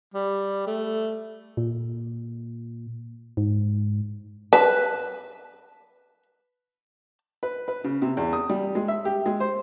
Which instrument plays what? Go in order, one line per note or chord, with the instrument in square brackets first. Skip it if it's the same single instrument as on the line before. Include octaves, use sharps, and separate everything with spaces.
[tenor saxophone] G3
A3
[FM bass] A#2
G#2
[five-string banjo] B4 [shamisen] A5
[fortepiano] B4
B4
C#3
C3
E2
D#6
G3
G#3
E5
G4
G#3
C5